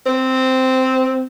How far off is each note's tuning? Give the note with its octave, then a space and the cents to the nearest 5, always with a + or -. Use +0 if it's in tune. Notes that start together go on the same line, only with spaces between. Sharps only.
C4 -5